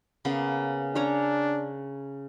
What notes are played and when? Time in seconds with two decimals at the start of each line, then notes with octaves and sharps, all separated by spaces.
0.25 C#3 A#3 B3
0.95 C#4 D4 C#5 A#5